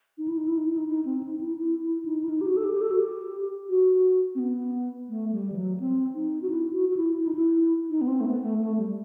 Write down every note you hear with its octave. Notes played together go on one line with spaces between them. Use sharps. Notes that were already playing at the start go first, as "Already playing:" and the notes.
D#4
E4
D#4
E4
D#4
E4
D#4
D#4
C4
D#4
E4
E4
E4
D#4
E4
D#4
G4
F#4
A4
G4
G4
A4
F#4
G4
F#4
C4
B3
A3
G3
E3
F#3
C4
D#4
F#4
E4
F#4
F#4
E4
E4
D#4
E4
D#4
B3
C4
A3
B3
A3
A3
G3